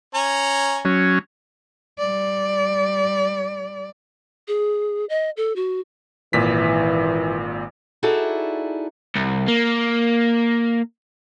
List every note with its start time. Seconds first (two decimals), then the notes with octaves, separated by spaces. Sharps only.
0.15 C#4 G#5 A#5
0.85 F#3 C#4
1.98 G3 D5
4.48 G#4
5.09 D#5
5.37 A4
5.56 F#4
6.33 G#1 A#2 E3 B6
8.03 D#4 E4 F#4 G#4 A4 D5
9.15 C2
9.48 A#3